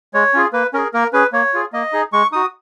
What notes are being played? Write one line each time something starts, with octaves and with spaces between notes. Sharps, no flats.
G#3 C#5
C#4 F4 G#4
A#3 B4
C#4 G#4 A#4
A#3 A#4
C#4 G#4 B4
A#3 C#5
F4 G#4
A#3 D#5
D#4 G#4
G#3 C#6
D#4 F#4 D#6